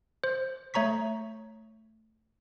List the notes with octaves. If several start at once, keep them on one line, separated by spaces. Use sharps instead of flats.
C5
A3 C#5 A#5 C#6 B6